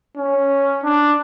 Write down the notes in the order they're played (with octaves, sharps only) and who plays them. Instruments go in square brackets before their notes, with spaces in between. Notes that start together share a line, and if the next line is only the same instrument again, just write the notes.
[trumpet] C#4
D4